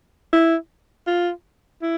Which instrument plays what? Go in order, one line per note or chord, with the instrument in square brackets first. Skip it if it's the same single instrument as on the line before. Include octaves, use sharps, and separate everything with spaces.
[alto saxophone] E4
F4
E4